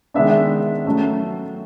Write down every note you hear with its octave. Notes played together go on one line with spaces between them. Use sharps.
D#3 G#3 B3 D4 E5
F#3 A3 C#4